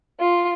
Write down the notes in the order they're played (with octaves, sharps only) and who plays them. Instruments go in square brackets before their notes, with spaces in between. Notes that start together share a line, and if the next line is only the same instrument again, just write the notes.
[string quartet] F4